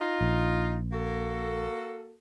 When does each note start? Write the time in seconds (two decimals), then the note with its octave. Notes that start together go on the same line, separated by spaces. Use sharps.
0.01 D#4 F4
0.21 A#1
0.93 A#3 F#4 A4